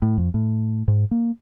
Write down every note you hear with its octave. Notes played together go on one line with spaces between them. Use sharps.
A2
F2
A2
G#2
A#3